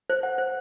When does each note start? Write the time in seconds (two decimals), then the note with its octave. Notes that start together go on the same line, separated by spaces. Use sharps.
0.10 C5
0.23 F#5
0.38 C5